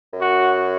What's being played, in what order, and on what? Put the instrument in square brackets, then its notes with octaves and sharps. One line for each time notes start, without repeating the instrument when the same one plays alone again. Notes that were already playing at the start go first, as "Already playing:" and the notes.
[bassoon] F#2
[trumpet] F#4